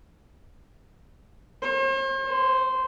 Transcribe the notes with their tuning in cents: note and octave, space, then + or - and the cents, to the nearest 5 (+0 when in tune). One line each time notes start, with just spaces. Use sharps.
C5 +45
C5 -10